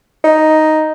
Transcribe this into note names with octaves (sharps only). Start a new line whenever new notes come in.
D#4